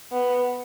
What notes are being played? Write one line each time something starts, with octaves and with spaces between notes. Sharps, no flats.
B3